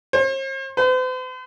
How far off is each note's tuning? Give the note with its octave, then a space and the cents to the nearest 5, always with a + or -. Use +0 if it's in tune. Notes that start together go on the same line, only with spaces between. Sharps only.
C5 +45
C5 -45